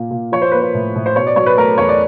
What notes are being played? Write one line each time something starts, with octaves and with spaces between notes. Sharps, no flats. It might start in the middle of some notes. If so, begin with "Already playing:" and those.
Already playing: A#2 A#3
A#2
F3 C#5
C5
A#3 B4
C5
A2
A2
C5
B2 C#5
D5
F#3 C#5
B4
A3 A#4
E2 C#5
D5